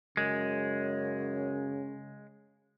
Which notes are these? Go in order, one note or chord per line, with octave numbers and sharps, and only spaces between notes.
F#2 C#3 G#3